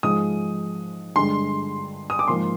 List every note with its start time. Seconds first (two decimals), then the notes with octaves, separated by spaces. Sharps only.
0.03 G#2 F3 G#3 D#6
1.16 G2 D3 G#3 C6
2.10 D#6
2.19 D6
2.28 G#2 F3 A#3 C6